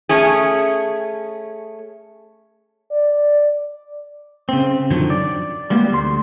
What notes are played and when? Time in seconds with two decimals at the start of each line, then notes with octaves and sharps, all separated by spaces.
0.09 A3 C#4 G#4
2.91 D5
4.49 C#3 C4
4.91 F#2 D3 D#3 F3 F#3
5.10 D5
5.70 G3 G#3 A#3 B3 D4 G4
5.92 D2 C6